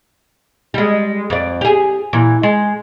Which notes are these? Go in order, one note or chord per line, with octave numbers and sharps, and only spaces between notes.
G3 G#3
F2 D5
G4 G#4
A#2 E3
G#3